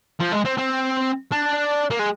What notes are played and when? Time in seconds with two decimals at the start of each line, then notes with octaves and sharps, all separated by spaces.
0.20 F3
0.32 G#3
0.45 C4
0.57 C4
1.32 D4
1.90 A#3
1.99 G#3